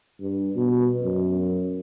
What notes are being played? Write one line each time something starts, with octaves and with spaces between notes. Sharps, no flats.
G2
B2
F#2